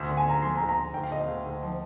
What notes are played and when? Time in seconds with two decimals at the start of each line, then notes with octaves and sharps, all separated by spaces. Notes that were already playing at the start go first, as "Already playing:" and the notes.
Already playing: D2
0.08 D3
0.17 G#5
0.25 D3 A#5
0.42 F3 C6
0.55 A#5
0.60 D2
0.69 A#5
0.76 D2
0.93 D2 G5
1.03 F5
1.11 D2 D#5
1.21 F5
1.28 D2
1.46 D2
1.63 F3